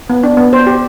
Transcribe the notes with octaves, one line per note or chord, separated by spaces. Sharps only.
B3
D4
B3
C5
G4